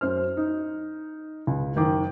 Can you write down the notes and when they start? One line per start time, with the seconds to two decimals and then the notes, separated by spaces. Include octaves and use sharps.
0.01 F#2 C5 F6
0.37 D#4
1.47 C#2
1.76 F#1 D#3 D6